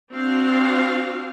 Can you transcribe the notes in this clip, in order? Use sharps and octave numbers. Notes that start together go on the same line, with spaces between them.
C4 D4 F#4 F5